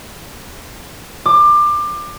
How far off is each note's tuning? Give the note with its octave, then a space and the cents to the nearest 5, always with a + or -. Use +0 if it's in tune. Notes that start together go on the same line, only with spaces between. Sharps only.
D6 +25